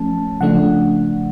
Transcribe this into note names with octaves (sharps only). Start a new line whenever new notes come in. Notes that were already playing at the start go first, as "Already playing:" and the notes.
Already playing: F3 A3 C#4 A5
C#3 F3 A3 D4 F#5